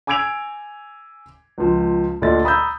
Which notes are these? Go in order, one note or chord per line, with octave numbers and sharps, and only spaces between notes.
G#5 D6 E6 G#6 D7 F7
C#2 F3
D2 A#2 D3 D5 D#5 A6
A#5 B5 D#6 E6 G6